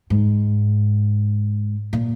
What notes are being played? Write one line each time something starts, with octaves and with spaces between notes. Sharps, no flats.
G#2
A#2